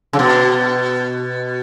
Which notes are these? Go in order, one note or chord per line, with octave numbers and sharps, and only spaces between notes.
C#3
B2